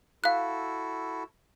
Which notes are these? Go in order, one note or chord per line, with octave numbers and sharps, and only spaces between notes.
E4 F#4 A4 F5 F#6